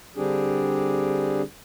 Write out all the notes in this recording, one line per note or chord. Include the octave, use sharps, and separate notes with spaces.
D3 G3 C4 D4 G4 G#4